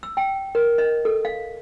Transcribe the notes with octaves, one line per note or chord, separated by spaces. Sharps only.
E6
G5
A#4
D#5
A4
F5